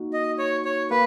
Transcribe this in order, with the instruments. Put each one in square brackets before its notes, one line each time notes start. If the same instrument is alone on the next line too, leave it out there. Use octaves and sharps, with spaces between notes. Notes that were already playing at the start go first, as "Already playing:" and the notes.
Already playing: [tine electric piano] A#3 D#4 F#4
[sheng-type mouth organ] D#5
C#5
C#5
[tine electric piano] A#3 [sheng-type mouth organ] B4